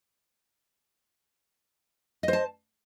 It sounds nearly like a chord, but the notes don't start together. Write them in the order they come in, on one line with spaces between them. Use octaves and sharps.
D#5 C5 A5